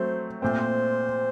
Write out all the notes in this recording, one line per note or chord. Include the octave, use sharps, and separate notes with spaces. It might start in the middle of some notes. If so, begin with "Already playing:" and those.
Already playing: F#3 A3 C4 C5
A#2 A3 C4 C5